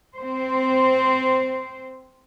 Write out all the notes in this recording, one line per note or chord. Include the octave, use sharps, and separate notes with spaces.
C4 C5